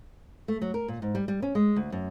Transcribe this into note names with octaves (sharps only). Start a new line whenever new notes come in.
A3
F#3
A#4
A#2
G#2
G3
G3
C#4
G#3
D2
F#2